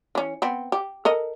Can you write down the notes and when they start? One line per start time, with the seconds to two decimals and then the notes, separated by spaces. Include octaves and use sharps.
0.15 E3 C#4
0.42 B3 C4
0.72 G4
1.05 A4 A#4 D#5